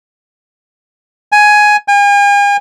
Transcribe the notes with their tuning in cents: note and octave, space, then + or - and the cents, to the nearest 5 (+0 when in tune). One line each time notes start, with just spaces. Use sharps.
G#5 +10
G#5 -45